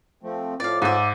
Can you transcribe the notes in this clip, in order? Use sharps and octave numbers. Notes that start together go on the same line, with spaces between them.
F3 A3 C4
A2 F3 D5 F5
G#2 D5 E5